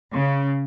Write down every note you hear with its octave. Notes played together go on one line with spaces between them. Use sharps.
C#3